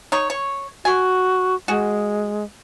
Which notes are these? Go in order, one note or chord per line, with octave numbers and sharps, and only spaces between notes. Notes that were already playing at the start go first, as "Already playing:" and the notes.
D#4 C#5
C#5
F#4 G#5
G#3 F#4 G#4